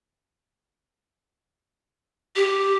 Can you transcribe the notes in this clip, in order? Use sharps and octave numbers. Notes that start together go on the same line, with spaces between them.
G4